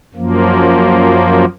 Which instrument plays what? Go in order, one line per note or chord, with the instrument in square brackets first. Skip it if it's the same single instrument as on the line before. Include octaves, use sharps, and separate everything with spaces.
[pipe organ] F#2 F3 A#3